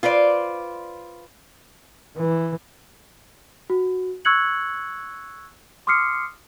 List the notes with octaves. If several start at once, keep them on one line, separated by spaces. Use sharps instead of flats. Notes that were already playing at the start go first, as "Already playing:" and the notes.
F4 B4 C5 D5
E3
F#4
C#6 E6 F#6 G#6 C#7 F#7
C6 D6 D#6 F6 C7 C#7